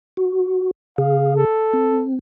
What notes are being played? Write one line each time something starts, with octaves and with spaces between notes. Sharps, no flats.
F#4
C#3 G#4 F5
A4
C4